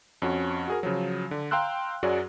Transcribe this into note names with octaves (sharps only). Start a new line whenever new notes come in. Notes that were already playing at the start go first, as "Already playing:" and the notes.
F2 C#4 F#4
F#4 G#4 A#4
C#3 F3 F#3
D3
F5 G5 A#5 C6 E6 F#6
F#2 F#3 F#4 G#4 D5